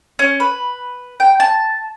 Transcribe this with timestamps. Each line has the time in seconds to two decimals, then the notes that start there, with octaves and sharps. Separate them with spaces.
0.19 C#4
0.40 B4
1.20 G5
1.40 A5